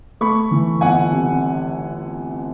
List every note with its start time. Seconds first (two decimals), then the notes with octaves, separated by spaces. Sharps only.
0.21 A3 B5 C#6
0.51 E3
0.81 G1 F#5 G#5
1.12 C3